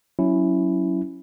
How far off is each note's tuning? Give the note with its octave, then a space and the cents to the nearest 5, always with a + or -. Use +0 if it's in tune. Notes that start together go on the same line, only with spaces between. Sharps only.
F#3 +0 C#4 +0 E4 +0